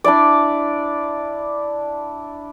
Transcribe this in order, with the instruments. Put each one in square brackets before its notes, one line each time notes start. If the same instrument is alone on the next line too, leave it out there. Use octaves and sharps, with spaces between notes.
[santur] D4 E4 D5